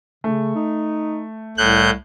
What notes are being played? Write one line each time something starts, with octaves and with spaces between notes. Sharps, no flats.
C#3 A3
D#4
C2 A2 F#6 G6